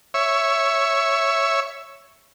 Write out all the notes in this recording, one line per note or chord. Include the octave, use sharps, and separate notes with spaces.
C#5 E5